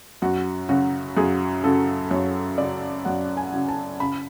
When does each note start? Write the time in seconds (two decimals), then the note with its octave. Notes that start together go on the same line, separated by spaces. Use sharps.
0.22 F#2 F#4
0.69 C#3 F#3 F#4
1.17 F#2 G#4
1.64 C#3 F#3 A4
2.11 F#2 C#5
2.58 C#3 F#3 D5
3.05 F#2 F#5
3.37 G#5
3.52 C#3 F#3
3.69 A5
4.00 C#3 B5